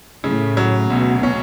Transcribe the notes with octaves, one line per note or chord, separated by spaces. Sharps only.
A2 C#3
F#3
D2 B2
C#4